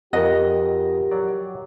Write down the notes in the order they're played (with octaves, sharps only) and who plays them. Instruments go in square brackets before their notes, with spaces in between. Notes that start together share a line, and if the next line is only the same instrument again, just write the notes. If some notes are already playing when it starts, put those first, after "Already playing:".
[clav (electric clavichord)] F2 [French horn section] G4 [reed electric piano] A#4 F#5 [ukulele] D#5
[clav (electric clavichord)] F#3 D5